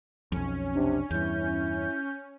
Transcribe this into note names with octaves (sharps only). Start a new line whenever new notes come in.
B1 F2 C#4
C3 D4
E2 G2 E4 G6